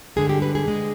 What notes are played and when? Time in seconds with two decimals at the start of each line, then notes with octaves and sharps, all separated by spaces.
0.16 G2 D3 G#3 G#4
0.29 G4
0.42 B4
0.55 G#4
0.68 D3 G#3